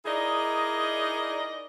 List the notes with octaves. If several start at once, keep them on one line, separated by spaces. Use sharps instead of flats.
D#4 E4 G#4 A#4 D5 D#5